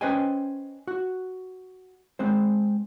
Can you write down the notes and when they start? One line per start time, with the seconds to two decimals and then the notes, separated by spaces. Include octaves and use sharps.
0.01 C#4 B4 C5 D#5 G5 G#5
0.87 F#4
2.19 G#3 C4 C5